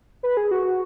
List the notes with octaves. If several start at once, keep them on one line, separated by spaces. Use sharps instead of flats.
B4
G#4
F#4